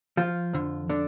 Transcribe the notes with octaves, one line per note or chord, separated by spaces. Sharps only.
F3 F4
F2 D3
D3 D4